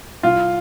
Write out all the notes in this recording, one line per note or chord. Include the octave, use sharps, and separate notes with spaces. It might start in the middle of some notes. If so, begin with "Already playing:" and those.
C2 F4